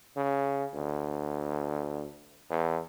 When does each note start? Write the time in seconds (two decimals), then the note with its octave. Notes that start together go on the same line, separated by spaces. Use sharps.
0.17 C#3
0.74 D2
2.50 E2